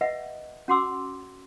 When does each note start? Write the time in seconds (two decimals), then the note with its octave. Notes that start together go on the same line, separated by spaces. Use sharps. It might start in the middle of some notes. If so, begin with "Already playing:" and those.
0.01 B4 D#5 E5 F#5
0.68 C#4 F#4 F#5 C6 D6 E6